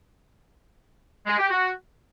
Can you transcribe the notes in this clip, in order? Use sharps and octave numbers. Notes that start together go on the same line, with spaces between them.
G#3
G4
F#4